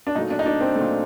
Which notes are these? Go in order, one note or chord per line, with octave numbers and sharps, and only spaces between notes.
D4
A#2 F#3 A3 D#4
D4
D#4
D4
C4
A#2 F#3 A3